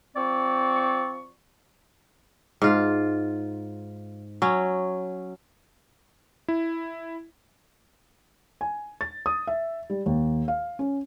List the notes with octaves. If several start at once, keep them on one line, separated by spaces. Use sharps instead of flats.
F3 C4 D5 C#6
G#2 F4
F#3 C#4
E4
G#5
A6
D#6
E5
G3
D#2
F5
C#4